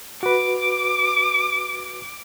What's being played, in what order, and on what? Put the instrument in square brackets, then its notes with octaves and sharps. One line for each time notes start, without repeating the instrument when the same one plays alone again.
[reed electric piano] F#4 B4 [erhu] D6